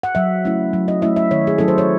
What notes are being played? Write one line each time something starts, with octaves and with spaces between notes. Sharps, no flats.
F#5
F#3 E5
A3 C#4 E4
F#3
D#5
A3 C#4 E4 E5
E5
D#3 C#5
G#4
F#3 C#4 E4 A4
C5
C#5